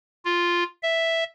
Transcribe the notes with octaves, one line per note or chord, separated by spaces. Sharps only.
F4
E5